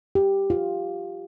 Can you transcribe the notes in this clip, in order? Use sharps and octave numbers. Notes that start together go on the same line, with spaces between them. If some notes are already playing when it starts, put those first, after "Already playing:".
G4
F4